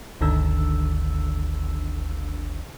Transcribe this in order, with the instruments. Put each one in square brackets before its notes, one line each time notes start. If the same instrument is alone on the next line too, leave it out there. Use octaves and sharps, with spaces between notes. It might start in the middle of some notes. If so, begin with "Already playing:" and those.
[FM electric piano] G1 D2 D3 D#3 D4 E6